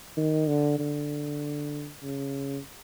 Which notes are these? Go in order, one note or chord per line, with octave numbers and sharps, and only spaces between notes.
D#3
D3
D3
C#3